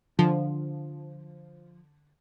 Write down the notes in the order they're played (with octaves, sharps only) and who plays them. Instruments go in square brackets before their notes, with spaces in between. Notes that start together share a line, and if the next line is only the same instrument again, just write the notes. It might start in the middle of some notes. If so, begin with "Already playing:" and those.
[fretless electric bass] D3 [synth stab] F3